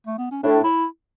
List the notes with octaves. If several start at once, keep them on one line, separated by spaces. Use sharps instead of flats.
A3
B3
C#4
A2 D4
E4